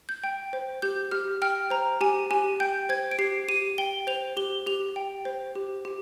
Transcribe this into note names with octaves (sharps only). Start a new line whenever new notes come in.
G6
G5
C5
G4 G6
G4 F6
G5 F6
C5 A#5
G4 G#5
G4 G#5
G5 G6
C5 G#6
D7
G4 C7
G4 D#7
G5 G7
C5 F7
G4 G7
G4 F7
G5
C5
G4
G4